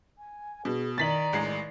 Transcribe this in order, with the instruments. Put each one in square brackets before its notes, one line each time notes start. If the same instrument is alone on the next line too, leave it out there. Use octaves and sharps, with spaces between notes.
[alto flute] G#5
[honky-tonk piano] B2 [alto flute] G#4
[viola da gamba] D#3 D5 [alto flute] A#5 [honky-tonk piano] A6 B6 F#7
[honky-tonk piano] A1 G#3 C7